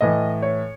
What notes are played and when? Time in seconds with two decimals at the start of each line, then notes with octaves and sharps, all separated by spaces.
0.01 A2 E3 D#5
0.42 C#5